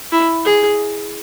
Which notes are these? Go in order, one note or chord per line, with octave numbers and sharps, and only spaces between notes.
E4
G#4